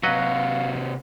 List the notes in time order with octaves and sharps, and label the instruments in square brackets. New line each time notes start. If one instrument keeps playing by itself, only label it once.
[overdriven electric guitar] C3 F#4 [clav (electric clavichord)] F#3 B4 D#5 [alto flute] F5